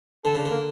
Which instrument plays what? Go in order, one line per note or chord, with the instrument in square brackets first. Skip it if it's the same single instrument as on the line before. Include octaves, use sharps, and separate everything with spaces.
[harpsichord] D3 [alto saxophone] A4
[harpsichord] C#3 [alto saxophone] D4
[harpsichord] D3 [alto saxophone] A#3